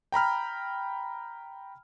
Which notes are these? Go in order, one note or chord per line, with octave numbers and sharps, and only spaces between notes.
G5 A#5 B5 F6